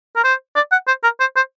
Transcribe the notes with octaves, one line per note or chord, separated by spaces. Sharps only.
A#4
C5
D5
F#5
C5
A#4
C5
C5